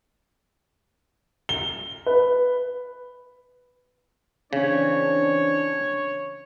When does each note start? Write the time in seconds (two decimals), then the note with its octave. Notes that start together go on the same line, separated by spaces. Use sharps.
1.49 G7
2.06 B4
4.53 C#3 E3 C4 D4 C#5